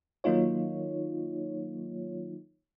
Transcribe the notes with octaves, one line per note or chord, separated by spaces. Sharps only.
D#3 F#3 A#3 D#4 F4 C#5